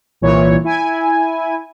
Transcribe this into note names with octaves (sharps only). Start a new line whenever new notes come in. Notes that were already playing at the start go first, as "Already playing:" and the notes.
C2 A#2 E3 C#5
E4 G#5